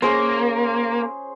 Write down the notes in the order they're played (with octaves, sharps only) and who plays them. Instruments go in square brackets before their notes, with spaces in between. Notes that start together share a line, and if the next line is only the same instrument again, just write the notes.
[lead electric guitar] A#3 [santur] C#4 G#4 C5